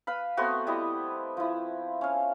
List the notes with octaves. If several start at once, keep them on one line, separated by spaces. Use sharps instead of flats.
B4 F5 B5
A3 B3 C4 F#4
G3 E4 D#5
F3 E4
C#4 F5